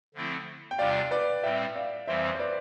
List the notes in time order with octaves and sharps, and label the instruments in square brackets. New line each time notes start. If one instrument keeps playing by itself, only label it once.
[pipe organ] D3 F3 A3 C4 E4
[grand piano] G5
[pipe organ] E2 C3 G3 D4 F4 [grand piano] D5 F5
[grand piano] B4 D5
[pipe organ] A2 G3 C4 [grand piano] E5 G5
[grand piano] D5 F5
[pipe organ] F2 E3 G3 C4 [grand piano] C5 E5
[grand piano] C5
B4 D5